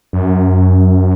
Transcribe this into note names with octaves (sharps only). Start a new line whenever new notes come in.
F#2